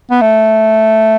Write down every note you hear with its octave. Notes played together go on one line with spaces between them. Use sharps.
B3
A3